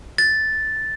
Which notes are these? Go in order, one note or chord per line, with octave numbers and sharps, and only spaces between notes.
A6